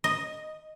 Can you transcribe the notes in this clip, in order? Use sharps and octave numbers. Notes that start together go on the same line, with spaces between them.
D#5